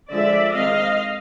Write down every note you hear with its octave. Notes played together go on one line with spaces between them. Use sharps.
D3 F3 G#3 D5 E5
D#3 G#3 C4 D#5 F5